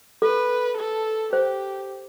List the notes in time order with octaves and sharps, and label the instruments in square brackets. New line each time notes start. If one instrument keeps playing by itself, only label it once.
[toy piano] A4 [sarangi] B4
[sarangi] A4
[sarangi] G4 [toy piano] C5